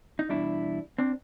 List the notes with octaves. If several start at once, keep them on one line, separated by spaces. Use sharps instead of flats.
D#4
E2 B2 G3 D4 E4
C4 D4